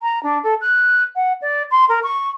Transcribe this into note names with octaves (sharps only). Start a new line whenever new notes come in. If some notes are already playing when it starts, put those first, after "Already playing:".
A#5
D4
A4
F#6
F#5
D5
C6
A#4
C#6